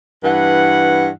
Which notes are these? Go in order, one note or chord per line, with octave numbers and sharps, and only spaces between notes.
G2 E3 F#5